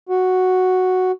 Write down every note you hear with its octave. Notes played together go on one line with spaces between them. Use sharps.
F#4